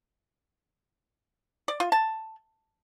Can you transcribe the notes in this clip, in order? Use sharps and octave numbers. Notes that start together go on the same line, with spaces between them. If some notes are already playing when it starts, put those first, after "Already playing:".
D5
F4
A5